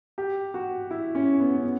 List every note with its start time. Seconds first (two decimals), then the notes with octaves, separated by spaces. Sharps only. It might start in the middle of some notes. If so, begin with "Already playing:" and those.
0.18 G4
0.54 F#4
0.91 E4
1.15 C#4
1.40 B3
1.57 C#4
1.64 B3